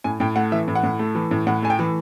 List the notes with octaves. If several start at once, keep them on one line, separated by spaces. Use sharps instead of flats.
A2 G#5
A2 G5
A3 F#5
E3 E5
A2
F#5
A2
A3
E3
A2
A2 F#5
A3 G#5
G5
E3